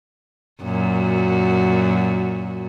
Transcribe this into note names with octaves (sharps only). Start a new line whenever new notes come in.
F#2 A#2 F#4